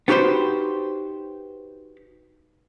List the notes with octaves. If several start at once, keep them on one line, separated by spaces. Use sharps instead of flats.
B3 D#4 F#4 G4 B4 C5